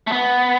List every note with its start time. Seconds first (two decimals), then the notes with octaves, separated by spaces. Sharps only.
0.07 A3
0.12 B3